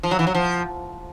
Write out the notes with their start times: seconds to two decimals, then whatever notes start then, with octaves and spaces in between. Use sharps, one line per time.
0.03 F3
0.11 F#3
0.19 E3
0.27 F#3
0.35 F3